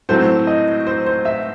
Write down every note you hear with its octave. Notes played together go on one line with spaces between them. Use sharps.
A2 F#3 A3 C4 C5
D#5
C5
C5
E5